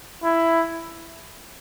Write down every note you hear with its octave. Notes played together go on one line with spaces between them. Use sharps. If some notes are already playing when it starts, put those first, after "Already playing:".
E4